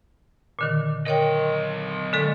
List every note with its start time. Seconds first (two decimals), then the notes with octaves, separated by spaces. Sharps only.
0.59 A#2 D3 D#3
1.07 F#3 A#4 C#5 D#5 G5
2.13 D3 G#3 A4